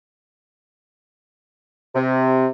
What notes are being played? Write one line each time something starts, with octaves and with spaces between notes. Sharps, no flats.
C3